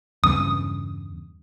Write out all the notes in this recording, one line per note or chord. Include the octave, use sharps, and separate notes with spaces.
E2 G2 C#3 D#6